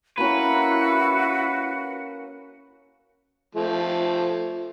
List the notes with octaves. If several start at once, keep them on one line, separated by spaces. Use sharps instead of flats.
A#3 C#4 E4 F#4 B4
F3 A3